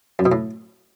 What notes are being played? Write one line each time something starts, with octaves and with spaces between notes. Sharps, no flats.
F#2
B2
A2